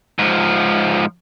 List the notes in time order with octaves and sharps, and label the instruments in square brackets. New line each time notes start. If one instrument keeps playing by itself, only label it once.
[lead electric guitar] G#2 F3